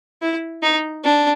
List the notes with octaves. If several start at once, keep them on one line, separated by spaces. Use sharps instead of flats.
E4
D#4
D4